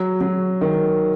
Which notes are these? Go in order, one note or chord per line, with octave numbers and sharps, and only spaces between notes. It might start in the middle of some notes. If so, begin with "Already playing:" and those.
Already playing: F#3
F#3
D#3